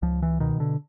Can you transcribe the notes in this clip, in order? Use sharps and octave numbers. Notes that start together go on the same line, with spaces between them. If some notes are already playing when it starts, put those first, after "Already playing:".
C#2 F3
E3
B2 D#3
D3